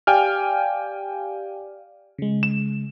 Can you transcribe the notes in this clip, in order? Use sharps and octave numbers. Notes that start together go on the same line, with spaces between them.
G4 D5 F5 G5 G#5 F6
C#3 G#3
E7